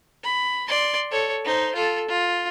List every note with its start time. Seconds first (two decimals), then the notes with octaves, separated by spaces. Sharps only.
0.24 B5
0.68 D5 C6
1.11 A4 C#5
1.45 D#4 C5
1.75 F4 A4
2.08 F4